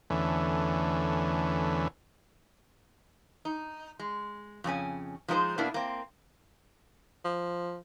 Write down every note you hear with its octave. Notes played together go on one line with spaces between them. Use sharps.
E2 D3 E3 A3 C#4
D#4
G#3
F2 C#3 C#4 G#5
F3 G#3 D#4 E4 G#4 C5
B2 A#3 B3 D4 E4
A#3 C4
F3